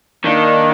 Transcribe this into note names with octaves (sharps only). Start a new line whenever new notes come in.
D#3 A#3 D4